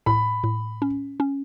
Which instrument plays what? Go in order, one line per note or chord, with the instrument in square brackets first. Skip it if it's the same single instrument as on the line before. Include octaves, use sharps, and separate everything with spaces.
[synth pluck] A2 [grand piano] B5
[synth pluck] A2
C#4
C#4